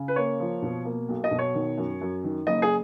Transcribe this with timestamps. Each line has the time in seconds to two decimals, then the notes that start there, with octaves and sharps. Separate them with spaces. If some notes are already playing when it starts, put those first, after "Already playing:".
Already playing: C#3
0.08 B4
0.16 A#3 C#5
0.40 F3
0.62 B2
0.85 A#3
1.09 B1
1.24 D#5
1.31 B2
1.39 C#5
1.54 D#3
1.78 F#2
2.01 F#2
2.24 D#3
2.47 F#1 D#5
2.62 G#4